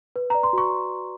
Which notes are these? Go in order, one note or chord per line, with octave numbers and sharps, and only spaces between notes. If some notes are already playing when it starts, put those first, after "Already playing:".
B4
D5 A#5
C6
F#4 C#6